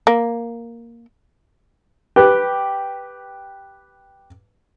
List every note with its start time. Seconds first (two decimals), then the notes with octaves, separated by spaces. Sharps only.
0.07 A#3
2.16 G4 B4